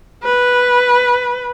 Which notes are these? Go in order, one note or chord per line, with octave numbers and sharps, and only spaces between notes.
B4